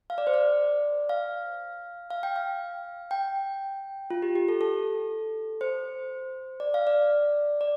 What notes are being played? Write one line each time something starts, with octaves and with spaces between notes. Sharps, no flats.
F5
D5
C5
D5
F5
F5
G5
F5
G5
F4
G4
G4
A4
A4
C5
D5
F5
D5
D5